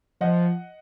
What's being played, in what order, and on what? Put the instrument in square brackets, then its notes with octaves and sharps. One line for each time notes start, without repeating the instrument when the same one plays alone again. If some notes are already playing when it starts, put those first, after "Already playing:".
[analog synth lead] F3 [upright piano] D#5 F#5